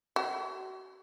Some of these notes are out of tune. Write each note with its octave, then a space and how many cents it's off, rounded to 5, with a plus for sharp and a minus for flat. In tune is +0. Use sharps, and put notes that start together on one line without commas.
F#4 +40